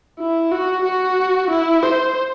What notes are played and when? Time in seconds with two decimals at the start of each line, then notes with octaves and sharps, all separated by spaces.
0.19 E4
0.52 F#4
0.84 F#4
1.50 E4
1.83 C5